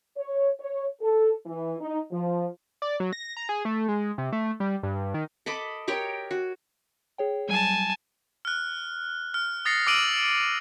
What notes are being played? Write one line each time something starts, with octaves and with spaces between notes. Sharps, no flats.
C#5
C#5
A4
E3
D#4
F3
D5
F#3
A#6
A#5
G#4
A3
G#3
C3
A3
G3
G2
D#3
A4 D#5 B5 D6
G4 A#4 C#5 G5
F#4
G#4 C#5 G5
F#3 G3 G#5 A5
F6 F#6
F6
D#6 A6 A#6 C7 C#7
D6 E6 F6 D7 D#7 F#7